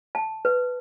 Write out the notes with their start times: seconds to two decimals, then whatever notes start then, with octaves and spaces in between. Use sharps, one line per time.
0.15 A5
0.45 B4